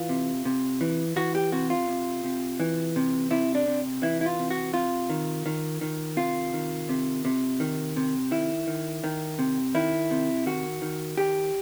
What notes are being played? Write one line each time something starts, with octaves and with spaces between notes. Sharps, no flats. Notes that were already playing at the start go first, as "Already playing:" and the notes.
Already playing: E3 F4
C3
C3
E3
E3 F#4
G4
C3 F#4
F4
C3
C3
E3
C3
C3 E4
D4
C3
E3 E4
E4
F4
C3
F#4
C3 F4
D#3
D#3
D#3
C3 F4
D#3
C3
C3
D#3
C3
D#3 E4
D#3
D#3
C3
D#3 E4
C3
D#3 F#4
D#3
D#3 G4